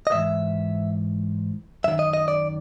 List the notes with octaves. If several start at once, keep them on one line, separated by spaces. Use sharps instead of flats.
D#5
G#2 E3 E5
F#2 D#3 E5
D#5
D#5
D5